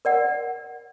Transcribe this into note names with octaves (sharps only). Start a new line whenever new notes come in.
A#4 D5 F#5